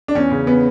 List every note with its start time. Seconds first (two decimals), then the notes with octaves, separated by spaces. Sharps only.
0.08 D4
0.15 E2 C#4
0.31 C#3
0.47 B3